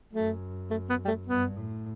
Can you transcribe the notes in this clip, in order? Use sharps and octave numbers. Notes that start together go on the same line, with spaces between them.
F#2 A3
A3
B3
G3
A3
G2 B3
A2